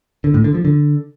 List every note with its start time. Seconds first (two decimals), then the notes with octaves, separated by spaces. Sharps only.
0.24 D3
0.34 A2
0.44 D3
0.54 F3
0.65 D3